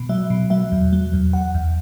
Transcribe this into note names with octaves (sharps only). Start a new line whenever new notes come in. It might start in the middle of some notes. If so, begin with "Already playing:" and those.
Already playing: B2
F#3 E5
B2
F#3 E5
E2
F#3
E2
E2 F#5
E2